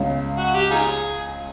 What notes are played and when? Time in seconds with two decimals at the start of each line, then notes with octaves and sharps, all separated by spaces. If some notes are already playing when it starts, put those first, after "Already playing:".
Already playing: C#2 C#3
0.38 F#4
0.54 G4
0.71 D#4 F4 G#4